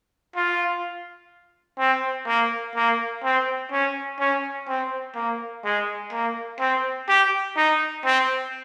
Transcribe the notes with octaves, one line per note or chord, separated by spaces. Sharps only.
F4
C4
A#3
A#3
C4
C#4
C#4
C4
A#3
G#3
A#3
C4
G4
D#4
C4